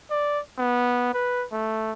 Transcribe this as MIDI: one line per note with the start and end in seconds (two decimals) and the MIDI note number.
0.10 0.40 74
0.58 1.10 59
1.14 1.46 71
1.52 1.92 57